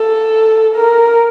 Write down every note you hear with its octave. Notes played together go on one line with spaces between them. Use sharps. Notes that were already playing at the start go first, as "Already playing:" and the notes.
Already playing: A4
A#4